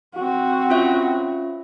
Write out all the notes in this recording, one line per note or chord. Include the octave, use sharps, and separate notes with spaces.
C4 F#4
C#4 F4 E5